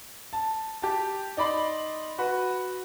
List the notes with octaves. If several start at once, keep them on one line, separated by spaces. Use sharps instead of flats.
A5
G4 A5
D#4 D5 B5 C6
F#4 B4